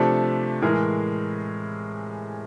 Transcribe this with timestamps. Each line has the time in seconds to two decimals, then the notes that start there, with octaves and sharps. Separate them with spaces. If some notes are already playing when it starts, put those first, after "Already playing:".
Already playing: C3 F3 A3 D4 G4 A4
0.62 A2 E3 G#3 G#4 A#4